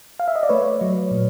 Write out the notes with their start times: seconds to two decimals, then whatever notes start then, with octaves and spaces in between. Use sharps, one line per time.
0.20 F5
0.28 E5
0.36 D#5
0.43 D5
0.49 A3 B4 C#5
0.81 F#3
1.11 A#2